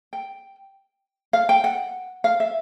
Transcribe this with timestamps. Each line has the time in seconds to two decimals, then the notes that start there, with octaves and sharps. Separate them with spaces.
0.13 G5
1.33 F5
1.49 G5
1.64 F#5
2.24 F5
2.40 E5